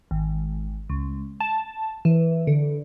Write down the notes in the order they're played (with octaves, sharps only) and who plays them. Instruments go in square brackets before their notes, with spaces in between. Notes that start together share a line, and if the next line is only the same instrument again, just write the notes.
[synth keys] G#1
C#2
A5
E3
D3